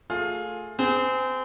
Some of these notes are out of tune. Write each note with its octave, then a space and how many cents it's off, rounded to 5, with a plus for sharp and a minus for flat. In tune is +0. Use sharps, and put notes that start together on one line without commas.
A3 +15 F4 +20 G#4 +15
C4 -30 G#4 +0